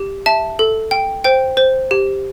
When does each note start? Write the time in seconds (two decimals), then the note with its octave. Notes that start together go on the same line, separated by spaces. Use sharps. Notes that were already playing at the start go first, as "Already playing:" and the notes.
Already playing: G4
0.26 E5 A5
0.59 A4
0.91 G5
1.24 C5 G5
1.57 C5
1.91 G4